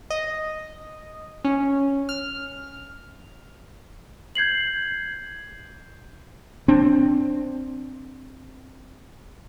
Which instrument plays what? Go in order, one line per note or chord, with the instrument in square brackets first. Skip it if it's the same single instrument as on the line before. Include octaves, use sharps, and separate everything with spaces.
[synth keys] D#5
C#4
F6
[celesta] G6 G#6 C7 F#7
[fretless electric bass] C4 D4